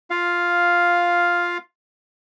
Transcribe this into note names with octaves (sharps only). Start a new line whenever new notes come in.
F4 F5